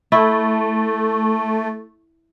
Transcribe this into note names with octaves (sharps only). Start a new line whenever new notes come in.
A3 E4